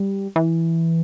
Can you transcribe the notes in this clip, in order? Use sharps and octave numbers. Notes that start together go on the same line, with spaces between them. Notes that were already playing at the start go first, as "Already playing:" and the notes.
Already playing: G3
E3